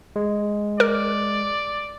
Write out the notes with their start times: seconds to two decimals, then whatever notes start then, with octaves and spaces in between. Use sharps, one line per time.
0.16 G#3
0.80 A#4 D5